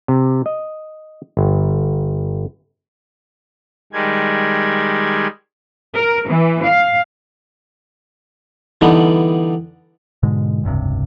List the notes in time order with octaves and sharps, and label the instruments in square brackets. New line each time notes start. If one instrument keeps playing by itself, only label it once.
[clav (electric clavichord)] C3
D#5
G1
[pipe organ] D#3 G3 G#3 G#6
[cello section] A#4
E3
F5
[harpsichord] D3 E3 G3 B3 D4 D#4
[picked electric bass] G#2 B2 D3 G#3
F1 C#2 G2 C3